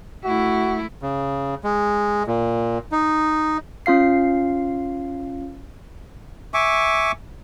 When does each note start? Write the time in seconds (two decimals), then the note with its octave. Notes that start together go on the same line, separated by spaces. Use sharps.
0.25 A3 E4 F#4
1.02 C#3
1.64 G#3
2.27 A#2
2.92 D#4
3.86 C#4 F4 F5 C7
6.54 E5 G#5 C#6 D6